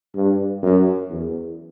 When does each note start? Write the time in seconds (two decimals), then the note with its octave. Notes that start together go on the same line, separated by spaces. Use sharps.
0.16 G2
0.63 F#2
1.10 E2